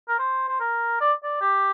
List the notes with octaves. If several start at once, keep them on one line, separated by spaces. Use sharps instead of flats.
A#4
C5
C5
A#4
D5
D5
G4